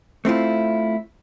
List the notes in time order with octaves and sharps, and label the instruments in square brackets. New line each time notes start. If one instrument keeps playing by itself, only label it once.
[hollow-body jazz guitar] A3 C4 E4 F4